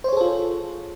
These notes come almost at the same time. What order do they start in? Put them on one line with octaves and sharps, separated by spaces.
C5 C#5 G#4 A4 F4